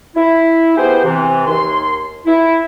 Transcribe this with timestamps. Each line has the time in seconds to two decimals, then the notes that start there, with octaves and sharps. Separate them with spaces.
0.16 E4
0.77 B3 G4 G#4 B4 C5
1.05 C3 E3
1.46 D#2 C6
2.26 E4